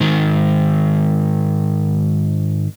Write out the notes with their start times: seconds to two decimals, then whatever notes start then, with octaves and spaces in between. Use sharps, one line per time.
0.01 G#2 D#3